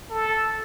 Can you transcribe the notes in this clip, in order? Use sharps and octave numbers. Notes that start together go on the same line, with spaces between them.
A4